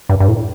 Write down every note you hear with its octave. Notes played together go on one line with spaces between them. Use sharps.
G2
G2
A2